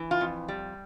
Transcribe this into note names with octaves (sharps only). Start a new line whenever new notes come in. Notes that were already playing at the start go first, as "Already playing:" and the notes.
Already playing: E3
F4
F2
G3